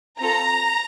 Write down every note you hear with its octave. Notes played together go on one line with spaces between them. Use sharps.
C4 F4 A4 A#5